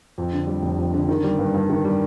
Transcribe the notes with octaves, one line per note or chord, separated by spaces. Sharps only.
F2
D3
G3
F1
F2
D3
D#3
G3
G2
G2
D#3
G3